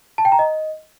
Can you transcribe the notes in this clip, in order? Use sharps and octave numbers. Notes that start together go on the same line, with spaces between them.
A5
G5
A#5
D#5